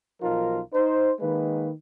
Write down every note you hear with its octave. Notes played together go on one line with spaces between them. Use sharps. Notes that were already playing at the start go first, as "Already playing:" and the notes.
B1 F3 D#4 F4 A#4
D#4 C5
D#3 G#3 A#3 B4